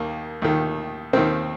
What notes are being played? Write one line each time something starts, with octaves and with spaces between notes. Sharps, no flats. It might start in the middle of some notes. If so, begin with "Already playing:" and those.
Already playing: D#2 D#3 A#3
D#2 D#3
D#2 D#3 C4